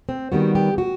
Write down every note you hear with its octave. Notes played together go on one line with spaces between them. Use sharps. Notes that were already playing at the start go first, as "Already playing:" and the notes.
C4
D#3 G3 B3 F#4
G4
F#4